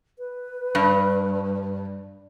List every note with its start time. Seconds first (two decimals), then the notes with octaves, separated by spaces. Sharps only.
0.19 B4
0.75 G2